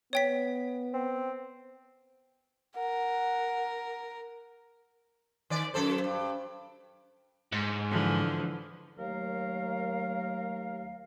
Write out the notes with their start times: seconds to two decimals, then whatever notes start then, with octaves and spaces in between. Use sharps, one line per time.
0.13 B3 C#5 G5 B6
0.94 C4
2.77 A#4 F#5
5.50 D#3 D5
5.74 F#2 A4 C5
6.04 G2
7.52 G#2
7.90 D3 E3 F3
8.98 D#2 F#3 A3 A#4 F5